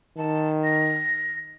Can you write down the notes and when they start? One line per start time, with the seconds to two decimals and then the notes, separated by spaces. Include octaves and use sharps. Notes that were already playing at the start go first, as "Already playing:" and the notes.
0.18 D#3 A5
0.64 A#6